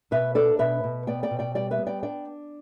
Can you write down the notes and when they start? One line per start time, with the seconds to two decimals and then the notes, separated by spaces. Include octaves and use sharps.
0.11 B2 B4 E5
0.35 D4 A4 D5
0.59 B2 B4 E5
0.84 B2
1.07 B3 D5 G5
1.23 D5 G5
1.31 B2
1.39 D5 G5
1.55 G3 D5 G5
1.71 B4 E5
1.78 B3
1.86 D5 G5
2.03 D4 D5 G5